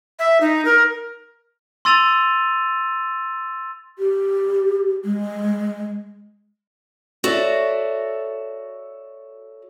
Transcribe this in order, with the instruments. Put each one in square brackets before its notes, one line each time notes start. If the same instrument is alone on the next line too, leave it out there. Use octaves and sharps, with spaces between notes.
[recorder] E5
D#4
A#4
[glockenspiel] C6 E6 A6 D#7 F7
[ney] G4
G#3
[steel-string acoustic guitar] F#4 A4 C#5 D5 E5